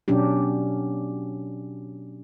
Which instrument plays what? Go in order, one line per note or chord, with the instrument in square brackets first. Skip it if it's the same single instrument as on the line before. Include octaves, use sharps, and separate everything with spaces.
[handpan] B2 F#3 C#4 D4 G4